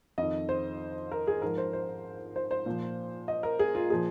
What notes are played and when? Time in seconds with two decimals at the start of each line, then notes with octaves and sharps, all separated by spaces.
0.18 F2 D#3 D#5
0.49 C5
1.12 A#4
1.27 G#4
1.42 G#2 F3 A#4
1.58 C5
1.73 C5
2.36 C5
2.51 C5
2.66 A#2 F3
3.28 D#5
3.43 A#4
3.59 G#4
3.75 F4
3.90 A#2 F3 G#4